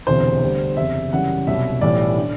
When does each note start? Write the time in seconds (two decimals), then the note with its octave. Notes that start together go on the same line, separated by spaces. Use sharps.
0.07 E1 D2 C3 E3 C5
0.42 D2 D3 G3
0.77 F#1 E2 C3 E5
1.13 F#1 F#2 E3 G3 F#5
1.47 C2 B2 F#3 E5
1.81 B1 A2 E3 G3 D5
2.18 D3